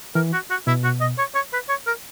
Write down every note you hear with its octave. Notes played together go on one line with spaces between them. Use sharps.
E3 A#4
F#4
F#4
B2 E4
F#4
D#5
C#5
C#5
B4
C#5
A#4